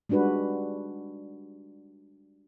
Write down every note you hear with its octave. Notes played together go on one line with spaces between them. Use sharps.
G3 G#3 D4 F#4 B4